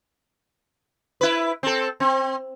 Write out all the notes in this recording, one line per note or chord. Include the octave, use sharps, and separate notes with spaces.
E4 B4
C4 A4
C4